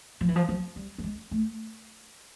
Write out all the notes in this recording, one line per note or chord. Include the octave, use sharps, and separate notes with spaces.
F3
E3
F3
F#3
G3
A3
G#3
A3